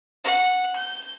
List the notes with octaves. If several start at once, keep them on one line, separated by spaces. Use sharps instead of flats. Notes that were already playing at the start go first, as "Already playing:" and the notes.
F#5
G6